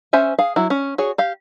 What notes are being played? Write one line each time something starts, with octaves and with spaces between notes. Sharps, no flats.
C#4 C5 E5 G#5
G#4 F5
F#3 E4 F#4
C#4
F#4 G#4 C#5
G4 F5